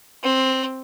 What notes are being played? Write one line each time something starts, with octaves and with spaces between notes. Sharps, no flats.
C4